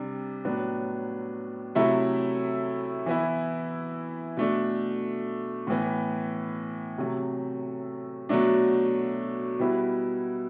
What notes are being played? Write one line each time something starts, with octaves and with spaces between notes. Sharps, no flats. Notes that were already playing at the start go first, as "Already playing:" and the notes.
Already playing: C3 G3 D4
A2 F#3 B3 D4
C3 F#3 A3 E4
E3 B3 E4
B2 A3 D4
A2 E3 B3
C3 F#3 A3
B2 F#3 A3 D4
B2 G3 B3 E4